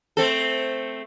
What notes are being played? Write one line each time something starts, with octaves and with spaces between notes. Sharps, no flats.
A3 C4 A4